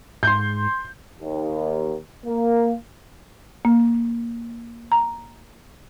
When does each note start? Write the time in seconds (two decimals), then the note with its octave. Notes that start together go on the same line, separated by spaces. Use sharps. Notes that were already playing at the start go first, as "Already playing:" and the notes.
0.23 G#2 C6 G6
1.20 D#2
2.26 A#3
3.65 A#3
4.92 A#5